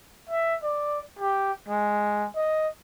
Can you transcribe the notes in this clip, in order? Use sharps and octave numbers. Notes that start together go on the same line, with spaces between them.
E5
D5
G4
G#3
D#5